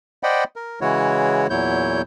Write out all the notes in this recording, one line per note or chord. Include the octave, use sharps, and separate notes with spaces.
C5 D5 D#5 F#5 G5 B5
A#4
C#3 E3 G#3 E4 F#4 C#5
E2 A#2 F#3 E4 C#5 G6